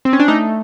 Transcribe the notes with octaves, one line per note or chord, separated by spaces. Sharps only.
C4
C#4
D4
A3 D#4